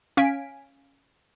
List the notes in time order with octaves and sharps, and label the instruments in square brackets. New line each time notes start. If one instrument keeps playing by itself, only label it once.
[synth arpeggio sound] C#4 F5 G#5 B6 D7